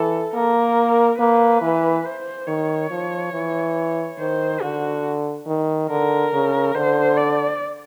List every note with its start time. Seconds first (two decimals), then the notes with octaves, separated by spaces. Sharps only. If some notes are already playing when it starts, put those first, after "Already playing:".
Already playing: E3 A4
0.34 A#3 A#4
1.19 A#3 B4
1.61 E3
2.05 C5
2.47 D#3 C#5
2.90 F3
3.33 E3
4.19 D#3 C5
4.61 D3 F#4
5.47 D#3
5.89 D3 A#4
6.33 C#3
6.74 D3 C5
7.17 D5